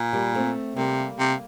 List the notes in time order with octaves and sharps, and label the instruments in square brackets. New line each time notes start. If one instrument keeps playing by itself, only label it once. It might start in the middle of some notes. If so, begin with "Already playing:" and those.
Already playing: [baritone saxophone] A#2
[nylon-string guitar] G3 A#3
A3 C4
[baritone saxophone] C3 [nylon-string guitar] G3 A#3
[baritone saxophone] C3